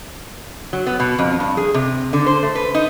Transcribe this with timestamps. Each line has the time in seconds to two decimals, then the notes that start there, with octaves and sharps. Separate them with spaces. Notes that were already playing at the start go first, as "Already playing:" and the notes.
0.73 F#3
0.87 B3
1.00 B2
1.19 F2
1.40 G2
1.57 G#4
1.74 C3
2.13 D3
2.26 C5
2.43 A3
2.55 B4
2.75 D#4